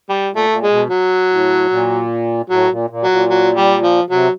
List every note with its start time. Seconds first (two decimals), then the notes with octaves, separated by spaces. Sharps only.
0.09 G3
0.30 A#2
0.36 A3
0.50 A#2
0.63 G#3
0.70 B2
0.90 F#3
1.31 A2
1.70 A#2
2.50 A2 F#3
2.70 A#2
2.90 A#2
3.04 F#3
3.10 A#2
3.30 F#3
3.56 G3
3.83 F3
4.10 C3 F#3